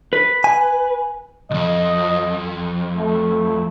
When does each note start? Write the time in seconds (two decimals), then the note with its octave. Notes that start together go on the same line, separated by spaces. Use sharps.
0.13 B4
0.44 G#5
1.51 C2 F2 D#5
2.97 A3